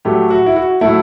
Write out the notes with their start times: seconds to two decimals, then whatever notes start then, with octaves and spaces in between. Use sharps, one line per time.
0.05 A2 F#3 A3 G4
0.30 F#4
0.46 E4
0.56 F#4
0.81 A2 F#3 A3 E4